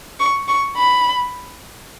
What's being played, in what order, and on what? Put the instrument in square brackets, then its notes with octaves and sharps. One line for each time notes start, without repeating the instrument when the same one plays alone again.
[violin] C#6
C#6
B5